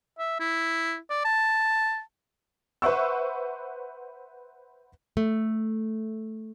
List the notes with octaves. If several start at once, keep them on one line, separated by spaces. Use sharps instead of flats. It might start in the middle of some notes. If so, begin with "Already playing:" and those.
E5
E4
D5
A5
B4 C5 E5 F#5 C#6 E6
A3